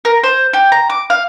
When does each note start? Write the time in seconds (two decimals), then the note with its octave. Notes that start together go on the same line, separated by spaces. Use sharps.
0.05 A#4
0.23 C5
0.53 G4
0.72 A#5
0.90 D6
1.10 F5